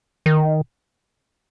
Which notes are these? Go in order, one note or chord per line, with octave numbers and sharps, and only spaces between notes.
D#3